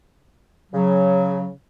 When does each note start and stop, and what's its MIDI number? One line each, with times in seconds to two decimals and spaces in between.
0.73 1.48 49
0.73 1.48 54